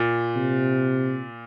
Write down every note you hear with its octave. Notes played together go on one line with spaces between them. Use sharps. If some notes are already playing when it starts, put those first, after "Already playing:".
Already playing: A#2
C3